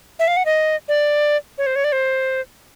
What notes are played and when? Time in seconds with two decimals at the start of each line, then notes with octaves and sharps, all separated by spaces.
0.19 E5
0.27 F5
0.37 F#5
0.45 D#5
0.88 D5
1.58 C#5
1.66 C5
1.75 C#5
1.84 D5
1.92 C5